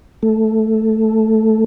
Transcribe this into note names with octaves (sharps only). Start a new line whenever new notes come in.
A3